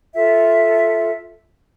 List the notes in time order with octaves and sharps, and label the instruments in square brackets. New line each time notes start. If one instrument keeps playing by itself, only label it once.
[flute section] F4 A4 E5